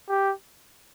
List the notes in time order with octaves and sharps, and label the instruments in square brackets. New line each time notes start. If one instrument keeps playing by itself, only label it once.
[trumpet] G4